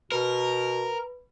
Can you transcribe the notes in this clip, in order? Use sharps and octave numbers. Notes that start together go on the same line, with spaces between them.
B2 A#4 B4